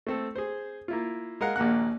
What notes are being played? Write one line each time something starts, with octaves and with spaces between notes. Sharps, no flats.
A3 C4 A4
G#4 C5
A#3 E4 F4
G#3 A#4 F5 F#5
A#1 D#2 A#3 F#5 F#6